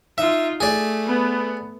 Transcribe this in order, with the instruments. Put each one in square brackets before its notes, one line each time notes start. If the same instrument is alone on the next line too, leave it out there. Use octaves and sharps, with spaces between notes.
[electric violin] D#4 F4 [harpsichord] E5
[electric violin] A3 [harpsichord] G#4 D5
[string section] B3